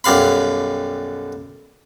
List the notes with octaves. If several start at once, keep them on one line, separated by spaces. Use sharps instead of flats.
B1 F#2 G3 F5 B5